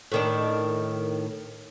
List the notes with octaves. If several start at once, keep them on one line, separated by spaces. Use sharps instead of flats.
A2 D#3 D4